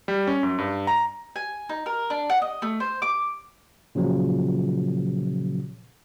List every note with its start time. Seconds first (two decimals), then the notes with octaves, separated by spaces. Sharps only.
0.08 G3
0.27 C#4
0.43 F#2
0.58 G2
0.87 A#5
1.36 G#5
1.69 D#4
1.86 A#4
2.10 D4
2.30 F#5
2.42 D#5
2.62 A3
2.80 C5
3.02 D6
3.95 A#2 C#3 F3 F#3